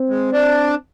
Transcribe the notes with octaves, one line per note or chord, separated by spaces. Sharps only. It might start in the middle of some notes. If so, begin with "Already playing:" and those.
Already playing: C4
G#3
D4